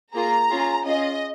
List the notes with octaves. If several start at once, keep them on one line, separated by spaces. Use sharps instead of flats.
A#3 F4 G#4 A#5
C#4 F4 G#4
C#4 F4 G#4 D#5